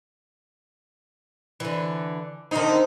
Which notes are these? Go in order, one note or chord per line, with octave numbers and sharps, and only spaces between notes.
D3 E3
D3 D#3 C4 D#4